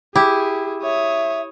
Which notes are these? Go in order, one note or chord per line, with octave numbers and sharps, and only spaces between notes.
E4 G4 G#4
C#5 E5 D#6